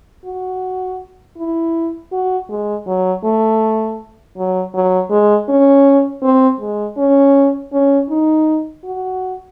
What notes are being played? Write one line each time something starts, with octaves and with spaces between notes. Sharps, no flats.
F#4
E4
F#4
G#3
F#3
A3
F#3
F#3
G#3
C#4
C4
G#3
C#4
C#4
D#4
F#4